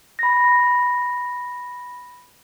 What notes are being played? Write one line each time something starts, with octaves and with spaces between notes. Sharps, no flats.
B5 A#6